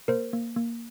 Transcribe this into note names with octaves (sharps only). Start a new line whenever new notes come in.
A#3 A#4 C5
A#3
A#3